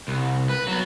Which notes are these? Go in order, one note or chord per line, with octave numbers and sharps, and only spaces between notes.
C2
B4
F#3 B3